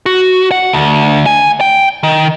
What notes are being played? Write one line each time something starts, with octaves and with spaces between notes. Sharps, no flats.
F#4
F#5
D2
G#5
G5
D#3